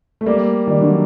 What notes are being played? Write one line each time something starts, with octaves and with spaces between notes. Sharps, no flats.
A3
G3 A#3
D#3 G3
D3 F#3